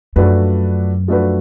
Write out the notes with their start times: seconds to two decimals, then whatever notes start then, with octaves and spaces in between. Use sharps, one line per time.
0.16 F#2 F3 A3 D4 F#4 B4
1.08 F3 A3 D4 F#4 B4